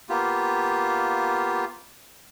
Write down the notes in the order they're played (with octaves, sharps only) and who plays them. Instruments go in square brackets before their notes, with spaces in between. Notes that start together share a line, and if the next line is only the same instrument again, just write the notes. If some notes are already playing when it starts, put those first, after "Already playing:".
[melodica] A#3 B3 F4 G4